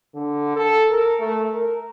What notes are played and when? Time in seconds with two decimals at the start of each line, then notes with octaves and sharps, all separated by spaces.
0.14 D3
0.56 A4
0.90 A#4
1.20 A3
1.53 A#4